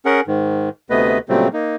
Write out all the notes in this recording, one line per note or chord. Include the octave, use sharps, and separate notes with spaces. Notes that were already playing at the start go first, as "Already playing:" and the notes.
C#4 G#4 A#4 F#5
G#2 D#3
D2 C3 A3 B3 B4 D#5
A#2 C#3 F#3 G3 A3 C4
A#3 D#4